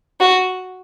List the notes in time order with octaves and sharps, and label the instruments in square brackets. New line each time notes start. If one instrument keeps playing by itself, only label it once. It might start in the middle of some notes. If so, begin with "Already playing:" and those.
[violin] F#4